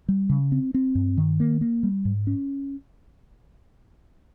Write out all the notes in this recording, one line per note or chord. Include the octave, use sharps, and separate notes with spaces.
G3
C#3
C4
C4
G2
D#3
A#3
A#3
G3
G#2
C#4